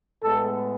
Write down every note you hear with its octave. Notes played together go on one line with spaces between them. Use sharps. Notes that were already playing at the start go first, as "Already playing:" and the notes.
A2 G#3 B3 A4